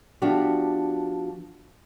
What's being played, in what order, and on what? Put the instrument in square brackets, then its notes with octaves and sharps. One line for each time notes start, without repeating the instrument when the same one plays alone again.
[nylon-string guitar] F3 B3 D4 E4 F#4 G4